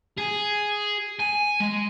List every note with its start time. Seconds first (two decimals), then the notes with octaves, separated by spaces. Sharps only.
0.18 G#4
1.19 G#5
1.60 G#3